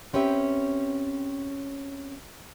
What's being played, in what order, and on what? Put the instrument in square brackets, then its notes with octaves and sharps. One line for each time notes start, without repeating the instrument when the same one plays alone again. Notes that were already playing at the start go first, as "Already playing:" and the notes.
[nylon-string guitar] C4 C#4 G4 B4 E5